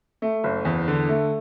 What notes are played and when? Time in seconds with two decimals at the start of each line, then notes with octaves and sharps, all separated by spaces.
0.22 A3
0.44 F#1
0.65 E2
0.88 D3
1.09 A3